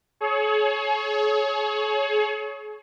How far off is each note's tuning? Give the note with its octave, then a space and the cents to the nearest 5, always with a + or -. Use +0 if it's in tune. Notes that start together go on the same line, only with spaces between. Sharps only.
G#4 +40 C#5 +0